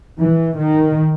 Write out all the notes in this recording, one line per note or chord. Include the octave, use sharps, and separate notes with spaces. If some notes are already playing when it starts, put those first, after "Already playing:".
E3
D#3